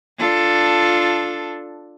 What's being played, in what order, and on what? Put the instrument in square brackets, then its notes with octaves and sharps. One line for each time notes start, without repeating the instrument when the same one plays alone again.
[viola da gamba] D4 F4 A4